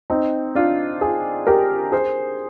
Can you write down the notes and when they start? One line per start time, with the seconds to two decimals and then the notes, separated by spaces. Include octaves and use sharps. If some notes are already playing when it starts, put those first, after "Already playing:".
0.10 C4 D#4
0.55 D4 F4
1.01 F4 G#4
1.47 G4 A#4
1.92 G#4 C5